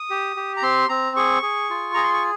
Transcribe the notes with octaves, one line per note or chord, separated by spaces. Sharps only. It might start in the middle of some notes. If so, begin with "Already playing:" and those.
Already playing: D#6
G4
G4
A#5
C4 C6
C4 A#5
G#4 C#6
G#4
F4
G#4 A#5
C6
C#6